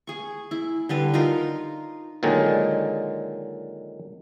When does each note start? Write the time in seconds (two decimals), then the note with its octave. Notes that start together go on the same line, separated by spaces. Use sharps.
0.07 G#4 C#6
0.51 E4
0.89 D3 G3 B4
1.14 D#4 F4 A#4
2.23 A#2 D3 D#3 F#3 G#3